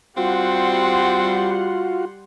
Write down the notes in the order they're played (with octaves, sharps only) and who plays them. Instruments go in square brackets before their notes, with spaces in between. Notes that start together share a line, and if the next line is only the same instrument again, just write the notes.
[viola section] G3 F#5 C6 [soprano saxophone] C4 [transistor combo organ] F4 F#4